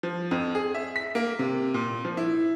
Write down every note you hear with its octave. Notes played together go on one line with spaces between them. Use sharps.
F3
F2
G#4
E5
B6
A#3
C3
A#2
F3
E4